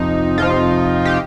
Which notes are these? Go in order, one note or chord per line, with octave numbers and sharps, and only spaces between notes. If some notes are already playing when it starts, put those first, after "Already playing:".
Already playing: F2 C3 F3 D#4
F2 C3 F3 F4
G4